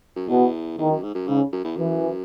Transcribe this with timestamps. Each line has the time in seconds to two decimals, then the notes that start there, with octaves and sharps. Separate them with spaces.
0.16 F#2
0.28 E2 B2
0.78 E2 D#3
0.90 F#2
1.03 G#2
1.15 F#2
1.27 G#2 C#3
1.52 F#2
1.64 E2
1.77 F#2 E3